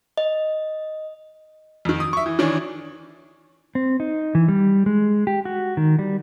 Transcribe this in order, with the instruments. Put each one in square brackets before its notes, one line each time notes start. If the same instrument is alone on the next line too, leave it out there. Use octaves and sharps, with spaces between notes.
[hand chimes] D#5
[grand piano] F2 D#3
D#6
E5 C#6
E3
D#3 E3 C#4 D4
[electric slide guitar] C4
D#4
E3
G3
G#3
G4
F#4
D#3
G3